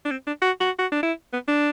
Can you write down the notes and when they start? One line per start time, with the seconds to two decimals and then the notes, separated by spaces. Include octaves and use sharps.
0.05 D4
0.11 C4
0.27 D4
0.42 F#4
0.60 F#4
0.79 F#4
0.92 D4
1.03 E4
1.33 B3
1.48 D4